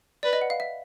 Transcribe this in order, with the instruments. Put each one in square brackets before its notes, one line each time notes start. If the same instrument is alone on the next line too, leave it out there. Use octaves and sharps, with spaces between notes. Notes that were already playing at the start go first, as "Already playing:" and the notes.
[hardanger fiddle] B4 [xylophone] D5
[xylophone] D#5
F#5
F5
E5